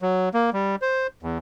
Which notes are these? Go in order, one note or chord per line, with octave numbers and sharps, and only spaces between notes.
F#3
A#3
G3
C5
E2